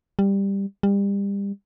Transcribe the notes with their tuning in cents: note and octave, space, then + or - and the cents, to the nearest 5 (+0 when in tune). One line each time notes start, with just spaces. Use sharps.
G3 +10
G3 +30